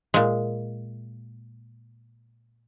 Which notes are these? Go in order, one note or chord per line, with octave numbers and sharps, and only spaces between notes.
A#2 G#3